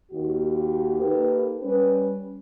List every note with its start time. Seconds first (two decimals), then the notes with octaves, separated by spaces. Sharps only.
0.11 D#2 F#4 G4
1.00 A#3 D#4 G4 A4 B4
1.63 G3 C#4 B4